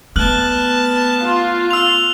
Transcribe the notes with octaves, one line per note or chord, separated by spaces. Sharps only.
A3 B3 A5 F6 F#6 F#7
F4
E6 F7